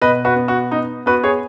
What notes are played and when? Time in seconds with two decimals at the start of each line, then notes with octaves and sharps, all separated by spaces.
0.02 B2 B4 D#5
0.25 F#4 B4
0.36 B3
0.48 F#4
0.71 B3 D#4
1.06 B3 F#4 B4
1.24 G#4 C#5